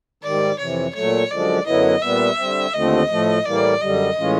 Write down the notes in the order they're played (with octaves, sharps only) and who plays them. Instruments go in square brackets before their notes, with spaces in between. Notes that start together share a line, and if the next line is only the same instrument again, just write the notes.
[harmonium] G#2 D#3 G3 [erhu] D5
[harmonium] F2 C3 E3 [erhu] C#5
[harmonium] A#2 F#3 A3 [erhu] C#5
[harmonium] F#2 D3 F3 G#3 [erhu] D5
[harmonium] F#2 D3 F#3 B3 E4 [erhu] D#5
[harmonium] A#2 G3 B3 [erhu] E5
[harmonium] D3 G3 C4
[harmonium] D#2 D3 F3 A3 C4 [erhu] D#5
[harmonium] A2 F3 A3
[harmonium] A2 E3 G3 A#3 [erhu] D5
[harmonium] F#2 D3 G3 [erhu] D#5
[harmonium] A2 E3 G#3 C#4 F4